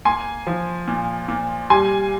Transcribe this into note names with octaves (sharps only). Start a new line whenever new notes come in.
A#3 G#5 C6
F3
A#2
A#2
G3 G#5 C6